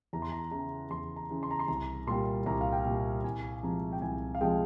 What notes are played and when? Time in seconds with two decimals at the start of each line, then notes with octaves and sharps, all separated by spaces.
0.13 E2 A#5
0.22 C6
0.32 A#5
0.51 C#3 E3 A#5
0.91 E2 C6
1.16 A#5
1.30 C#3 E3
1.43 C6
1.51 A#5
1.59 C6
1.68 C2 A#5
2.07 A#2 G3 C6
2.46 C2 A#5
2.61 F5
2.73 G5
2.85 A#2 G3
3.24 C2 G#5
3.63 C3 F3 G#3 A#5
3.92 G5
4.02 C2 G#5
4.35 F5
4.41 C3 F3 G#3 G5